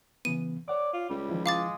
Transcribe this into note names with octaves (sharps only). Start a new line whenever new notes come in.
C#3 E3 B3 D#7
C#5 D5 F#5 D6
F4
C#2 G3
D#3 F3 E4
G#3 F5 D6 A6